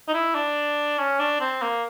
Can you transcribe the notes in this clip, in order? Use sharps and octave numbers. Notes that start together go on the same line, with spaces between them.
D#4
E4
D4
C#4
D4
C4
A#3